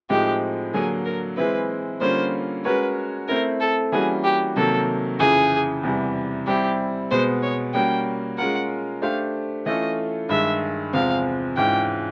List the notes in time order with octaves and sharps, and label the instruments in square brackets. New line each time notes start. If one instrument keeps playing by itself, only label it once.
[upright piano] A2 F3 G#3 C4 D#4 [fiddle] G4
[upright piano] D3 F#3 A#3 [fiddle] G#4
[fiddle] A#4
[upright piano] E3 G#3 C4 E4 [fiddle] B4
[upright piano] D3 G3 A#3 C#4 F4 [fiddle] C5
[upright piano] G#3 C#4 F#4 A#4 C#5 [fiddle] B4
[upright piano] A3 C4 E4 [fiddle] A#4
[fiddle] A4
[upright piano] E3 G3 A#3 C#4 F#4 [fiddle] G#4
[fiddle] G4
[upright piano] C3 D#3 F#3 A#3 [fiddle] A4
[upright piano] F2 C#3 E3 [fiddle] G#4
[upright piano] E2 C3 E3 G3
[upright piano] G3 C4 E4 [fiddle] G4
[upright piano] B2 G#3 B3 [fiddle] C5
[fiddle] C#5
[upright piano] G3 A#3 C#4 F#4 [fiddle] G5
[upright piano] G#3 C#4 F4 A#4 [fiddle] F#5
[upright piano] A3 D4 G4 C5 [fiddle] F5
[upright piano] E3 A3 C#4 F4 A4 [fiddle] D#5
[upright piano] G2 D#3 G#3 [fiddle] E5
[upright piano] E2 C3 F3 G#3 C4 [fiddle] F5
[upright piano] G#2 E3 G#3 C#4 F4 [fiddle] G5